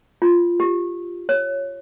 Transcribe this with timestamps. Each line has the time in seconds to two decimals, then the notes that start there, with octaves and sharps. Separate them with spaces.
0.22 F4
0.60 G4
1.29 C#5